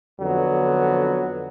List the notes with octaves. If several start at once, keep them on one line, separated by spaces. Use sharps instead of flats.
F2 D3 F#3 B3